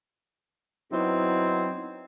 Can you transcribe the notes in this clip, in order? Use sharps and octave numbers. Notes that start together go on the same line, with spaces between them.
F#3 B3 C4 D#4 E4